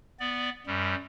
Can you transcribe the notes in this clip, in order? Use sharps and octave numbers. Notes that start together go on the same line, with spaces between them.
B3 D5
F#2 G3